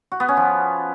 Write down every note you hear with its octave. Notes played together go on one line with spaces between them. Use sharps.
F#4
B3
C#4
F3